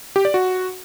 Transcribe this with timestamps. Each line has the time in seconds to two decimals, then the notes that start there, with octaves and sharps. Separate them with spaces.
0.16 G4
0.25 D5
0.34 F#4